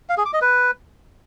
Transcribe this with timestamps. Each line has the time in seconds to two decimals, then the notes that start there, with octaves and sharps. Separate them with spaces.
0.09 F5
0.17 G#4
0.25 D6
0.33 D#5
0.41 B4